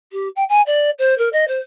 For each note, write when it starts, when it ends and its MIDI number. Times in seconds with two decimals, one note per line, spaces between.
0.12 0.28 67
0.36 0.44 79
0.49 0.61 80
0.66 0.90 74
0.98 1.16 72
1.17 1.29 70
1.32 1.45 75
1.47 1.59 72